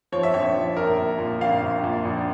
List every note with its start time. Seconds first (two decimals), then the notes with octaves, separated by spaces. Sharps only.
0.12 F3 C#5
0.23 E5
0.34 A#1 C#5
0.55 F3
0.76 A#1 A#4
0.98 A#2
1.19 A#2
1.41 A#1 F5
1.62 A#1
1.84 A#2
2.05 A#1